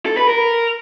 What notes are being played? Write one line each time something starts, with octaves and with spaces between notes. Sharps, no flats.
A4
B4
A#4